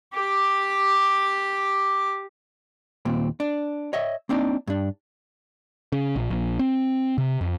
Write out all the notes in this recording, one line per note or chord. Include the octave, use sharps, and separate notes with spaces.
G4 D6
D#2 A#2 C4
D4
C#5 D#5 E5
A#3 C4 D4 D#4
G2 D4
C#3
A#1
A#1
C4
C3
F2